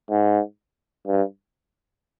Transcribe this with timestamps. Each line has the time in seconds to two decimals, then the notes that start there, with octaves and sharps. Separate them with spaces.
0.10 G#2
1.07 G2